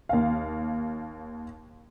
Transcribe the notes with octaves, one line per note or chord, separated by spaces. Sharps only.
D#2 F5